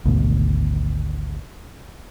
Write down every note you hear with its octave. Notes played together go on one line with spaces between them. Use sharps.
G#1 D2 B2